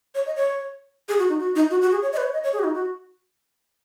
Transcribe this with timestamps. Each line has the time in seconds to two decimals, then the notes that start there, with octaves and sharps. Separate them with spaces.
0.15 C#5
0.26 D#5
0.36 C#5
1.09 G#4
1.19 F#4
1.29 D#4
1.40 F#4
1.56 D#4
1.71 F#4
1.81 F#4
1.92 G#4
2.02 C#5
2.13 D#5
2.17 B4
2.23 C#5
2.33 D#5
2.44 C#5
2.53 G#4
2.59 F#4
2.64 D#4
2.75 F#4